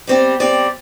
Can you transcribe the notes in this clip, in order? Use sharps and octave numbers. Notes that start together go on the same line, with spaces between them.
G3 C4 G4 D5
G3 C4 G4 D5